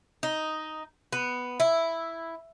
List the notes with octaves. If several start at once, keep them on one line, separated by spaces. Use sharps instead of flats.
D#4
B3
E4